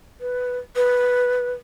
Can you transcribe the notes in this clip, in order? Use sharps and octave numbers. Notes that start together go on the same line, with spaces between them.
B4
B4